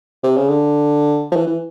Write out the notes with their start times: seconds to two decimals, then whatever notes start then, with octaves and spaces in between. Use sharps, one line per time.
0.24 C3
0.37 C#3
0.49 D3
1.32 F3
1.36 E3
1.47 E3